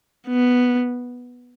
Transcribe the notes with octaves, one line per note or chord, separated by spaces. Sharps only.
B3